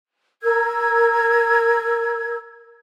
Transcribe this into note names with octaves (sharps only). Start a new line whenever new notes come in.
A#4 E6 G#6